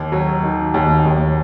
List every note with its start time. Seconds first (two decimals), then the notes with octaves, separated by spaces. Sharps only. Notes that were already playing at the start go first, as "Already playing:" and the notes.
Already playing: D#2
0.12 F#3
0.43 D#3
0.74 D#2
1.05 D#2